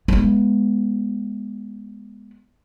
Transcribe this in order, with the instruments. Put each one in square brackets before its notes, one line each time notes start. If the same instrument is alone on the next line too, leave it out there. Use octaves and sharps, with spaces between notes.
[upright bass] G#3 B3